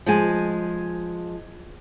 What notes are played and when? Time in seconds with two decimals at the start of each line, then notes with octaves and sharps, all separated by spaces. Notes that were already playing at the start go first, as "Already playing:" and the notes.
0.06 F3 G#3 G#5